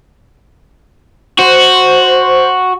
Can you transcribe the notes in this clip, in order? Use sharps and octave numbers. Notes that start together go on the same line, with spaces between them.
F#4 C5